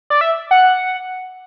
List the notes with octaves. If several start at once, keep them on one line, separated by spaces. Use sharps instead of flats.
D5
E5
F#5